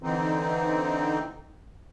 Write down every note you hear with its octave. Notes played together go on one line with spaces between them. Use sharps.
D3 E3 C4 D#4